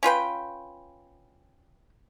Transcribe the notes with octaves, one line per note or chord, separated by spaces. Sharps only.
C#4 F4 B4 G5